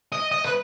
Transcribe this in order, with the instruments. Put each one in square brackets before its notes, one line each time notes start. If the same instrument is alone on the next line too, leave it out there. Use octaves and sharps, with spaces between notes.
[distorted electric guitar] D#5
D#5
B4